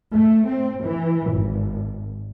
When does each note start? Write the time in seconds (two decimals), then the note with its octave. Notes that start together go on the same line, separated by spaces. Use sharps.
0.11 A3
0.47 C4
0.84 E3
1.31 G#1